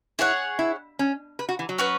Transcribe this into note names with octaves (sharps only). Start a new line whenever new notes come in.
E4 G#4 C#5 F#5
E4
C#4
B4
F#4
E3
F#3
C#4 F#4 B4